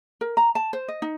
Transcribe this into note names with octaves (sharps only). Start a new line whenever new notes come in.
A#4
A#5
A5
C5
D#5
D#4